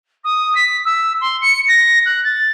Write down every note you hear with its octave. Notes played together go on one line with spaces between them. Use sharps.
D#6
B6
E6
C6
C#7
A#6
F#6
A6